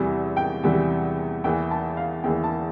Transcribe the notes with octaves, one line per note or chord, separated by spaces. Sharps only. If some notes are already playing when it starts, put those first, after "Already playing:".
Already playing: E2 C3 E3 G3
G5
E2 C3 E3 G3
E2 E3 A#3 G5
A5
F5
E2 E3 A#3 G5
A5